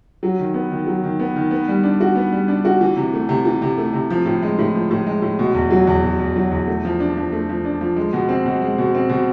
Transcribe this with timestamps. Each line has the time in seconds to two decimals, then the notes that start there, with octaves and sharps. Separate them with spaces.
0.23 F#3
0.39 D#3
0.54 B3
0.71 D#3
0.87 F#3
1.04 D#3
1.20 B3
1.36 D#3
1.51 B3
1.68 G3
1.83 D4
2.00 F#4
2.16 B3
2.32 G3
2.48 D4
2.65 F#4
2.81 E3
2.97 C3
3.14 A3
3.29 C3
3.45 E3
3.62 C3
3.78 A3
3.93 C3
4.10 F3
4.25 A2
4.42 G#3
4.58 A2
4.75 F3
4.91 A2
5.06 G#3
5.22 A2
5.39 B2
5.54 E2
5.71 F#3
5.87 E2
6.03 B2
6.19 E2
6.36 F#3
6.51 E2
6.67 A3
6.85 F3
7.00 D4
7.17 F3
7.32 A3
7.49 F3
7.65 D4
7.81 F3
7.96 G#3
8.13 B2
8.29 C4
8.46 B2
8.62 G#3
8.78 B2
8.94 C4
9.09 B2